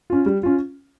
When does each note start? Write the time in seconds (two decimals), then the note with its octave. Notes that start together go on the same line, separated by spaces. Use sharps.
0.10 C#4 F4
0.26 G3
0.43 C#4 F4